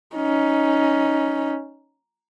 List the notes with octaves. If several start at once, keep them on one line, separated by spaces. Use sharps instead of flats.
C#4 D#4